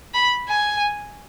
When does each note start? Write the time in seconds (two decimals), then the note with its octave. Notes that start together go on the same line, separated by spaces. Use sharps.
0.14 B5
0.49 G#5